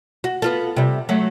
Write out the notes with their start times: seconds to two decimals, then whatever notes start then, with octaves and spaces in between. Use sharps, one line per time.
0.24 F#4
0.42 B3 F4 A4
0.76 C3 G3
1.09 F#3 A3